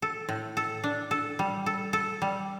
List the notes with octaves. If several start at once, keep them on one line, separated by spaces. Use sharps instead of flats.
A4
A2
A4
D4
A4
G3
A4
A4
G3